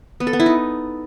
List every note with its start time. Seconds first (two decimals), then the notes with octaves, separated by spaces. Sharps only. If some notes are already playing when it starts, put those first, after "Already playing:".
0.20 B3
0.27 A4
0.33 B3
0.40 E4
0.46 D#4